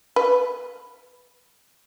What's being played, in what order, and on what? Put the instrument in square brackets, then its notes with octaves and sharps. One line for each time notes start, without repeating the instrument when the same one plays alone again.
[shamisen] B4